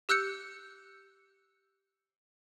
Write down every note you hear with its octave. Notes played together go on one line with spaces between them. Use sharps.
G4 E6 F#6 G6 C#7